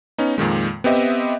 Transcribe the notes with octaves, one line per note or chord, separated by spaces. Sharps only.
B3 C#4 D#4
F2 A#2 D#3 G#3
B3 C4 G4 D#5 E5